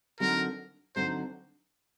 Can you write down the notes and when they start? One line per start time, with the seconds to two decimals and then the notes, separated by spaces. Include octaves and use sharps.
0.20 D3 F#3 C4 D#4 A4 A#4
0.96 D3 F#3 C4 D#4 A4 C5